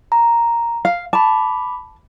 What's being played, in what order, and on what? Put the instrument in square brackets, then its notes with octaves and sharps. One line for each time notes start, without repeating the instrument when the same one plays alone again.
[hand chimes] A#5
[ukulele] F5
[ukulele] A5 [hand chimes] B5 D6